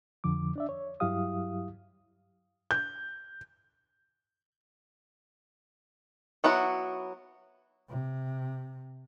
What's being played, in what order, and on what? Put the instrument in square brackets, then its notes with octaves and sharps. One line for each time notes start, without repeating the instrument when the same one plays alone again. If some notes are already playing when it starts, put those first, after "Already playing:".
[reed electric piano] F2 D3 F3 D6
D4 D5 E5
C#5
G2 F#3 E4 G4 F5 D#6
[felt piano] G6
[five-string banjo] F#3 B3 E4 F#4
[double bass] C3